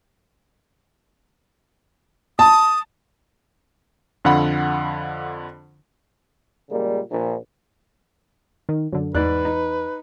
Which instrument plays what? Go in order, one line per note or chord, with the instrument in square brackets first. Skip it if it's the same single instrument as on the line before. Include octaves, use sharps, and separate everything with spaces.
[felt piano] A5 [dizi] D#6
[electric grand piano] F2 D3 F4 F#5 B5
[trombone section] A#2 C#3 G3 G#3 A#3
A#1
[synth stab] D#3
F#2 D3
[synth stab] E2 [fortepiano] G#2 D5 F#6 [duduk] B4
[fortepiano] D#4